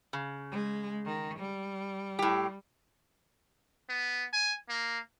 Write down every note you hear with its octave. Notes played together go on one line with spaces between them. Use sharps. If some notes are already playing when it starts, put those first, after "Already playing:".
C#3
G#3
D#3
G3
A2 G4
B3
G#5
A#3